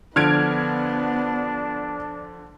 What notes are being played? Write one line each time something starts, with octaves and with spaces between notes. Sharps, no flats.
D3 F3 B3 D4 F6 G#6 D7